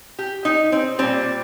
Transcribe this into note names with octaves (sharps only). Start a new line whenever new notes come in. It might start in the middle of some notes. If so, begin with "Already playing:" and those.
G4
D#4
C4
A#2 G3 C4